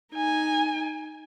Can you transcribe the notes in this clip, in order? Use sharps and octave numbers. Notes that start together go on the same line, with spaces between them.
D#4 G#5